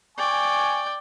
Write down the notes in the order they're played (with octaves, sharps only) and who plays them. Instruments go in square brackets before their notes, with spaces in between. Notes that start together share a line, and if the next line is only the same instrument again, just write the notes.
[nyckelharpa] D5 G5 [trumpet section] G#5 C#6